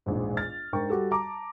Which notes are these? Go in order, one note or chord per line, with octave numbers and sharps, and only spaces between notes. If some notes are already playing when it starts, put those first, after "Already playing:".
E1 A#1 G#2
F6 A6
G#2 D4 A#4 G5 C#6
G3 F#4 G4 A4
A5 A#5 D6